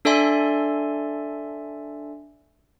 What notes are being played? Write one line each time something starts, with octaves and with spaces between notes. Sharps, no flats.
D4 A4 D5 E5 G#5 C6